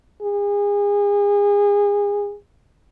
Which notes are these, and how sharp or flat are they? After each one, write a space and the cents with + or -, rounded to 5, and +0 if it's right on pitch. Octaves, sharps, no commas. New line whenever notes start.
G#4 -30